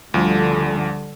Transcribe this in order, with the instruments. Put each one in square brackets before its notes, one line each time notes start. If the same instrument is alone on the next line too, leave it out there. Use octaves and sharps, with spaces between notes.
[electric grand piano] D2 F3 [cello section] D3 G3